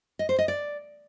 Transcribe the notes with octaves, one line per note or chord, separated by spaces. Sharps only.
D#5
C5
D#5
D5